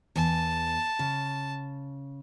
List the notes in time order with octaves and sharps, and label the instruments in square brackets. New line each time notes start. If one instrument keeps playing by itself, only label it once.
[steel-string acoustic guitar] E2 G#5 [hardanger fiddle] A5
[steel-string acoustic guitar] C#3